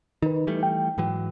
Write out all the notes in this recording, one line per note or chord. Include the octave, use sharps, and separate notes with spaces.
D#3 D#4 B4
E3 G3 A3
G5
G#2 E3 F#3